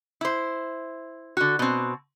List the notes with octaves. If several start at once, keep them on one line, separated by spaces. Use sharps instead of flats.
E4 C5
D3 F#4
B2 C4